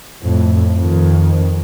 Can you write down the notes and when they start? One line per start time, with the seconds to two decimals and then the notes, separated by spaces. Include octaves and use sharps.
0.23 F2 A2
0.77 F2 D#3